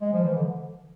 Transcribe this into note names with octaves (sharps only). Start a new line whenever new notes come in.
G#3
F3
E3
D3